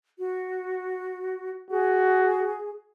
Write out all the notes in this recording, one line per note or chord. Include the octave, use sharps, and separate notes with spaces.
F#4
F#4 G#4